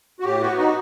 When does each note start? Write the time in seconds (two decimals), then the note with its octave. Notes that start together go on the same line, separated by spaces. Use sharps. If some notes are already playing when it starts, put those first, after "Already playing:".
0.20 F#4
0.24 A2 G4
0.41 B3 F#4
0.57 D#4 F#4